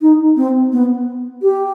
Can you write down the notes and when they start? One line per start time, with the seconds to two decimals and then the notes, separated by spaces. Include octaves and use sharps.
0.02 D#4
0.36 C4
0.72 B3
1.42 G4